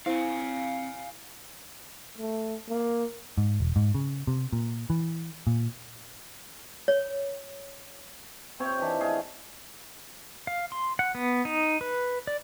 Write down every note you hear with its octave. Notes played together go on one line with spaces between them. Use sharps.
C4 E4 C5 F5 G#5
A3
A#3
G#2
E1
G#2
C#3
C3
A#2
E3
A#2
C#5
C3 C4 C#5 G5
D#3 E3 D4
A3 G#4 D#5 F5
F5
C6
F#5
B3
D#4
B4
D5